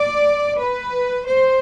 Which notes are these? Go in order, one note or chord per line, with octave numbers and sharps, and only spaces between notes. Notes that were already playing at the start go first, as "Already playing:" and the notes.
Already playing: D5
B4
C5